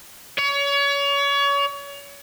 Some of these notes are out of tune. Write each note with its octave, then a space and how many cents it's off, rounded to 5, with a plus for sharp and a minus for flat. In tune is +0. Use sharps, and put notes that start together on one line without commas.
C#5 +30